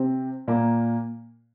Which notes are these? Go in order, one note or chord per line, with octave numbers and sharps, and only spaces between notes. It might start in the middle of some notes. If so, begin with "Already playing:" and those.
Already playing: C3 C4
A#2 A#3